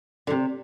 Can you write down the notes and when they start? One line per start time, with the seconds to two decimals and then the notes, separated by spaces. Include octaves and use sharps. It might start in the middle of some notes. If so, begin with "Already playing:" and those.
0.27 D3
0.30 C3